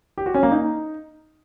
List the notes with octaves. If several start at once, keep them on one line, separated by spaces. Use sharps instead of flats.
G4
F#4
C#4
A#3
D#4